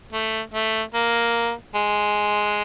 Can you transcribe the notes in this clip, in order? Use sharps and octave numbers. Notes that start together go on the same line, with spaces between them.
A3
A3
A#3
G#3